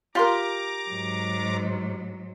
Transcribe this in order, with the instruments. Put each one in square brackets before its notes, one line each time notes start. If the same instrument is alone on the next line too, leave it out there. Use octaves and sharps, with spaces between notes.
[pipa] F4 C6 [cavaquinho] G4 A#4 [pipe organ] A#5 D6
[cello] G#2 F#3